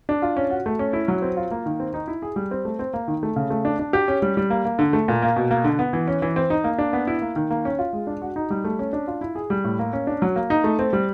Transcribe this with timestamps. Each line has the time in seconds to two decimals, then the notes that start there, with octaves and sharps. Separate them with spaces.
0.09 D4
0.22 F4
0.37 C#4
0.50 F#4
0.66 A3
0.79 C#4
0.93 E4
1.08 F#3
1.22 C4
1.37 F4
1.51 A#3
1.66 D#3
1.80 C4
1.94 D#4
2.08 E4
2.22 G#4
2.36 G3
2.51 C4
2.65 A3
2.79 C4
2.94 A#3
3.08 D#3
3.23 A3
3.36 C#3
3.50 A3
3.65 D4
3.79 D4
3.93 G4
4.08 C#4
4.22 G3
4.37 G3
4.50 A#3
4.65 A#3
4.79 D3
4.93 A3
5.08 A#2
5.22 A#3
5.36 B2
5.51 A#3
5.64 D3
5.79 B3
5.93 E3
6.08 C#4
6.22 E3
6.36 C4
6.50 D#4
6.64 A#3
6.78 D4
6.93 B3
7.07 E4
7.22 A#3
7.36 D#3
7.50 A#3
7.65 C#4
7.79 F4
7.93 G#3
8.07 D4
8.22 F#4
8.36 D#4
8.50 G3
8.64 A3
8.79 C#4
8.93 D4
9.07 F4
9.21 E4
9.35 G#4
9.50 G3
9.64 A2
9.79 A#3
9.93 C#4
10.07 D4
10.22 F#3
10.36 A#3
10.50 D#4
10.64 A3
10.79 C4
10.93 G3